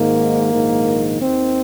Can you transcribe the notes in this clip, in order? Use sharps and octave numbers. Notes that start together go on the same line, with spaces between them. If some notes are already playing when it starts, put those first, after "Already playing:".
Already playing: G#1 G#2 D#3 A#3
A#1 G#2 D#3
D#2 D#3 C4